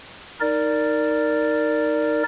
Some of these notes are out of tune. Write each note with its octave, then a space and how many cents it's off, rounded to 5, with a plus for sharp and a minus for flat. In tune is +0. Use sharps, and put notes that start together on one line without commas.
D#4 +0 A#4 -10 D5 +0